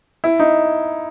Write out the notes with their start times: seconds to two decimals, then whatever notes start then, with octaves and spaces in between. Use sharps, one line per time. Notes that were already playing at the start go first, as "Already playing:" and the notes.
0.24 E4
0.40 D#4